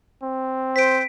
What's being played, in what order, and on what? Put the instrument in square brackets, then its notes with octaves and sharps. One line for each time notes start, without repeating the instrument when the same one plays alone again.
[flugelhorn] C4
[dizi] C5 [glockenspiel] B6 D7